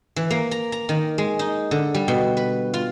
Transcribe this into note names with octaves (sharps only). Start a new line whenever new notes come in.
E3
A#3
A#5
A#5
D#3
G#3
D#4
D3
G3
B2
B4
F4